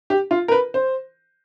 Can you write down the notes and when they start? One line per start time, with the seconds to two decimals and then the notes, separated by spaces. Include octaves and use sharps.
0.10 G4
0.31 F4
0.48 A#4
0.52 B4
0.74 C5